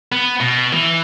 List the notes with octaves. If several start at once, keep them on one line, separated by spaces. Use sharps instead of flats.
B3
B2
E3